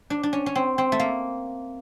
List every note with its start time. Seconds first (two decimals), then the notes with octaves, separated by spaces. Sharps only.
0.10 D4
0.23 D4
0.33 C#4
0.46 C#4
0.55 C4
0.78 C4
0.92 A3
1.00 A#3